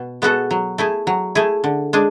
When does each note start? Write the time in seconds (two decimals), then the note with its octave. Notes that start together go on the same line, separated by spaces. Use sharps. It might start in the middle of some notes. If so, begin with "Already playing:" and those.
Already playing: B2
0.22 G#3 B3 F#4 A4
0.51 F#3
0.78 A3 E4 G#4
1.07 F#3
1.35 A3 E4 G#4
1.64 D3
1.93 G#3 D4 G#4